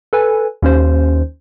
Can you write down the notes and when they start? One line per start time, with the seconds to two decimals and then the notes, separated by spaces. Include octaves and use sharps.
0.13 A4 B4 G#5
0.62 D#2 C#4 C5